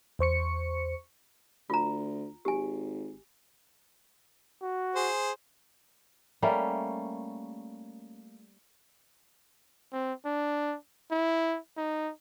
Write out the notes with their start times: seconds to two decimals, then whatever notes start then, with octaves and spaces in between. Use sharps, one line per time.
0.19 E2 C5 C#6 C#7
1.70 D2 F4 A#5
2.45 G#1 G4 G#5
4.62 F#4
4.96 G#4 C5
6.42 G3 A3 A#3 C#4
9.92 C4
10.25 D4
11.11 E4
11.77 D#4